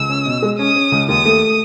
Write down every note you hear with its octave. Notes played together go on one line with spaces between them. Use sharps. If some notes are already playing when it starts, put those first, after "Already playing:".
Already playing: C#2 E6
C#4
B2
G#3
C#4 D#6
C#4
C#2
D#2 D#6
A3